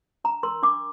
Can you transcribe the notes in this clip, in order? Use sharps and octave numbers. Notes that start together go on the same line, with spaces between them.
D4 A#5
A#4 C6
D4 D6